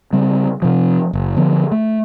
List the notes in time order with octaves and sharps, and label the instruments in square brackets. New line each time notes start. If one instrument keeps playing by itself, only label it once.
[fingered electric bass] C#3 G3 C4
C3 F3
F#1
D3 F3 B3
A3